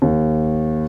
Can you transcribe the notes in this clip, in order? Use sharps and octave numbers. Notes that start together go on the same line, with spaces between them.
D#2